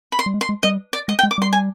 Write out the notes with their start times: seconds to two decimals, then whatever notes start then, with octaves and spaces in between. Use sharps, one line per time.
0.12 B5
0.19 C6
0.26 G3
0.34 G#3
0.41 C6
0.49 G#3
0.63 G3 D#5
0.93 D5
1.08 G#3 D#5
1.19 G5
1.23 G#3
1.31 D6
1.38 G3 C6
1.53 G#5